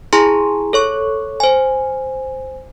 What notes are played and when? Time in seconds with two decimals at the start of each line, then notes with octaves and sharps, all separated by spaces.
0.13 E4 G#4 G#5 A#5 C6
0.73 A4 C#5 C#6
1.40 C5 G#5